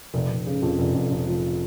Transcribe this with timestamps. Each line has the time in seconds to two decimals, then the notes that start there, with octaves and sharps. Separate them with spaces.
0.14 F1
0.30 F1
0.46 C#3
0.62 F2
0.79 F1
0.95 F2
1.11 F2
1.27 F3